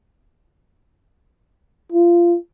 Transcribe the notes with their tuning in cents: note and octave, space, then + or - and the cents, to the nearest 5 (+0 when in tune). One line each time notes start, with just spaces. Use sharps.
F4 -20